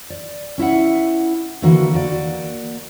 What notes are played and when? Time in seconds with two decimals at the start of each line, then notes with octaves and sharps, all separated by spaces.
0.10 D5
0.58 C#4 E4 E5 F#5
1.62 D3 E3 A#3 F#4
1.93 A#3 F#4 D5